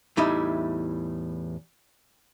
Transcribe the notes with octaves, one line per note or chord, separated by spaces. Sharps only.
E2 A2 G3 D#4 E4